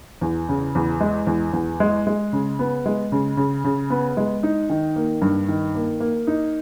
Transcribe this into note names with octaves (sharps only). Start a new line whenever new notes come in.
E2
C#3
E2
G#3
E2
E2
G#3
G#3
C#3
B3
G#3
C#3
C#3
C#3
B3
G#3
D#4
D#3
A#3
G2
D#3
A#3
A#3
D#4